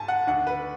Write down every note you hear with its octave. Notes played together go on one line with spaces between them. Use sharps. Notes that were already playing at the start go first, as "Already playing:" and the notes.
Already playing: G#2 G#5 A5
F#5
D2 D3 F#5
B4